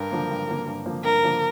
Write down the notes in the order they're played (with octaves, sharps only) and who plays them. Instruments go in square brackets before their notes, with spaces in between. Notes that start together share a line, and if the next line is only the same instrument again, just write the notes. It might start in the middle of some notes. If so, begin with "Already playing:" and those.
Already playing: [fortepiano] G2 [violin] A#4
[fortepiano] D3 F3 A#3
G2
D3 F3 A#3
G2
D3 F3 A#3
[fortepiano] G2 [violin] A#4
[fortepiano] D3 F3 A#3